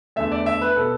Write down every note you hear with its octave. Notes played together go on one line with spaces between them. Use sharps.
E2 D3 A3 E5
D5
E5
B4
B2 B3 A4